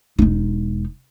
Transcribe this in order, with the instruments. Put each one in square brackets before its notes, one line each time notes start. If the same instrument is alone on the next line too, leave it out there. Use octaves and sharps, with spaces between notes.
[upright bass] E1 D#4